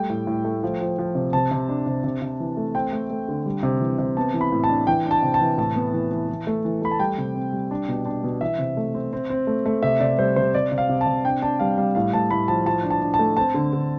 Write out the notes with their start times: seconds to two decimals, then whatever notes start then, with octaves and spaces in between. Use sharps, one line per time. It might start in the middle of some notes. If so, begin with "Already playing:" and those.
Already playing: G3 A3 G5
0.10 A2
0.27 A2
0.44 A3
0.63 F3
0.81 F3
0.99 F3
1.15 C3
1.33 C3 A5
1.51 C3
1.69 D4
1.86 C3
2.04 C3
2.22 C3
2.40 E3
2.57 A3
2.75 C4 G5
2.93 A3
3.10 A3
3.29 D3
3.46 G3
3.63 C3
3.81 E3
3.98 C3
4.17 B3 A5
4.34 E3
4.41 B5
4.52 A2
4.64 A5
4.69 D4
4.87 E3 G5
5.06 D4
5.11 A5
5.23 C3
5.34 A5
5.41 E3
5.58 A2 A5
5.76 B3
5.94 E3
6.11 E3
6.29 E3
6.47 A3
6.65 E3
6.82 A3 B5
6.91 A5
7.00 G3 G5
7.18 C3
7.35 C4
7.53 G3
7.71 D4
7.88 B2
8.06 D4
8.23 B2
8.41 E3 E5
8.59 C3
8.77 A3
8.94 C4
9.13 C4
9.30 C4
9.47 A3
9.66 A3
9.83 C3 E5
10.00 C3 D5
10.18 G3 C5
10.36 C3 C5
10.55 C3 D5
10.72 C3
10.78 F5
10.89 C3
11.01 A5
11.07 C3
11.24 D4 G5
11.42 D4 A5
11.60 G3 F5
11.78 G3 F5
11.95 A2 F5
12.13 A2 A5
12.31 A2 B5
12.48 F3 A5
12.66 F3 A5
12.84 D4
12.90 A5
13.01 D4
13.14 A5
13.19 A3
13.37 C4 A5
13.54 D3
13.73 D3